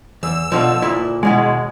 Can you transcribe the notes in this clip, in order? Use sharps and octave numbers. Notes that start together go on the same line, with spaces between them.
E2 E6
B2 D3 F3
D2 A#2 E4
D#2 B2 G#3 E4